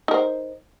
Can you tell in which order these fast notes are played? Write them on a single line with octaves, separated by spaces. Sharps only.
D#4 A#4 C5